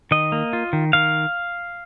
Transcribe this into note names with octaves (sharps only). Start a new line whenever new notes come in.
D#3 D#5
A#3
F4
D#3
D#3 F5